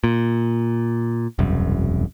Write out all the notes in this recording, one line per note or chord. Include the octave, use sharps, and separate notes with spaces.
A#2
E1 C2 F#2